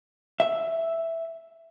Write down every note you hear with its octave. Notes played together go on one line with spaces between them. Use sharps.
E5